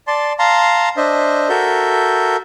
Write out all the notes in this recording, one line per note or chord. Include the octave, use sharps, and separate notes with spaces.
D5 A5 C6
F5 A5 A#5 C6
D4 C5 D#5 E5
F#4 A4 A#4 E5 G6